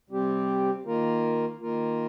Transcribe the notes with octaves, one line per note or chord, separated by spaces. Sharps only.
C3 G3 C4 G4
D#3 A#3 F4 A#4
D#3 A#3 F4 A#4